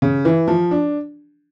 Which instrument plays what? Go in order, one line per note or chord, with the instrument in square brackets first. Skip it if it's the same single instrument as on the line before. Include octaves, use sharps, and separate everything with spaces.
[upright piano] C#3
E3
F3
D4